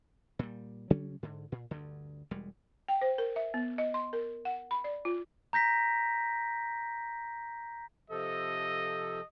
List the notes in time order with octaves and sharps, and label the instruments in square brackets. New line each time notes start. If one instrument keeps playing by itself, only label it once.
[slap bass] A#2 G3
C#3 F#3 G3 C#4
G#2 D3
A#2
D2 G2 D3
E1 G3 G#3
[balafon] G5
C5
A#4
E5
B3
D#5
C6
A#4
F#5
B5
D5
F4
[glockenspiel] A#5 G6 A#6 B6
[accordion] C3 F3 A4 [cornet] D#5